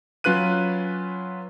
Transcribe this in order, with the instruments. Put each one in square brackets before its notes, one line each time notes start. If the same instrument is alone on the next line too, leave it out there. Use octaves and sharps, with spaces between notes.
[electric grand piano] F#3 C#4 F4 B4 F#6 D#7